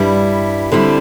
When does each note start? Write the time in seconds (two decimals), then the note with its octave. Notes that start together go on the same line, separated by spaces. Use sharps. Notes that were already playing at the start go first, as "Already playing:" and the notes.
Already playing: G2 G3 E4
0.72 D3 G3 C4 E4